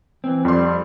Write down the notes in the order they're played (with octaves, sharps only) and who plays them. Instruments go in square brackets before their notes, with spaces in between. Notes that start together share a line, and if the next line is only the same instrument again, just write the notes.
[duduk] E3 [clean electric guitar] C4
[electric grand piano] F2 C6 [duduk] G3